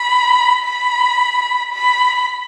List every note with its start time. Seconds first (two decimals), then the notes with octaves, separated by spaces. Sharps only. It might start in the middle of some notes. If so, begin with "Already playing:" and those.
Already playing: B5
0.64 B5
1.73 B5